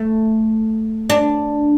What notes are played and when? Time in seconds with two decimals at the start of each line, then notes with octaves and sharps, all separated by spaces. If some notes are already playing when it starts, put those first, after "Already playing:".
Already playing: A3
1.10 D4